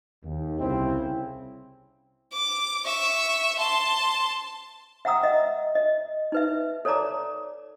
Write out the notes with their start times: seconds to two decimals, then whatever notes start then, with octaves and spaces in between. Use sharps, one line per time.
0.23 D#2
0.60 C2 C#3 C4 E4
2.33 D6
2.86 E5 C#6
3.59 A5 C6
5.05 E5 F#5 G5 A#5 D#6 E6
5.23 D#5 E5
5.75 D#5
6.32 D#4 B4 E5
6.85 A4 C#5 D5 A5 A#5 D6